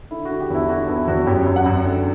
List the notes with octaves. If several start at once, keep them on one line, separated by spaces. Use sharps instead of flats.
D3 E4
F#4
D3
G4
E2 E4
D3 F#4
E2 E4
E2 F#4
F#2 G4
F#2
F#5
F#2
D3